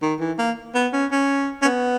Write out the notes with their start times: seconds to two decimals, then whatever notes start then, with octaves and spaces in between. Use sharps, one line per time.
0.02 D#3
0.20 E3
0.38 A#3
0.75 B3
0.93 C#4
1.11 C#4
1.62 C#4
1.66 B3